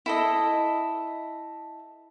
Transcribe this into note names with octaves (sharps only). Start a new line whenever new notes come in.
E4 A4 D#5